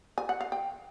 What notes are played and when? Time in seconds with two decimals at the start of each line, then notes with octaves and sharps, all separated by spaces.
0.18 G#5
0.29 F#5
0.41 F5
0.52 G5